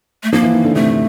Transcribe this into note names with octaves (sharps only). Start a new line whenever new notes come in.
A3
F3 A#3
E3
D#3
D3
C3 A3